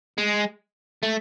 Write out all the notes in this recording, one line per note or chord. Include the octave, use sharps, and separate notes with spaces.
G#3
A3